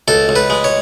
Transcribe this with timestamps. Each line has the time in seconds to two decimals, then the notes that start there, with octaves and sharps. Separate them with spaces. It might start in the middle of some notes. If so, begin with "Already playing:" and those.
0.08 C#2 A4
0.29 C#2
0.36 B4
0.50 G#3
0.64 C#5